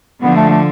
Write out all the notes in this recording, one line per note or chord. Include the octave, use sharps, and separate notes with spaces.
D3 F3 B3
A3
A3